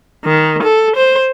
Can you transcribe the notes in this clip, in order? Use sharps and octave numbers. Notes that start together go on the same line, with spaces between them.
D#3
A4
C5